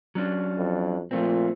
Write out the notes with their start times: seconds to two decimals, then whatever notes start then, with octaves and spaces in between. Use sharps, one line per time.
0.15 F#3 C#4 D4
0.57 F2
1.11 A#2 F3 A3 C4